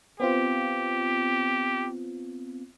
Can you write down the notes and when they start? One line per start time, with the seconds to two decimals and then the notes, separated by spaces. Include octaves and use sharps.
0.20 B3 C4 F4 G4